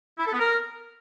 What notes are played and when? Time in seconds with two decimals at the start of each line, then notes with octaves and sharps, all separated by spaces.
0.19 E4
0.26 A4
0.32 B3
0.39 A#4